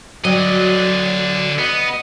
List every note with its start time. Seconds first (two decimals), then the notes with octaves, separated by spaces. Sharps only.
0.25 D3 F#3 D5 D#5
1.59 B3 D#5